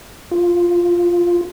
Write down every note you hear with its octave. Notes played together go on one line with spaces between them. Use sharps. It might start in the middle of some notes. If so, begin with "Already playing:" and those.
F4